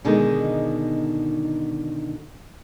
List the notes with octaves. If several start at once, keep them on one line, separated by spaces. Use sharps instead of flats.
B2 D3 D#3 G#3 D#4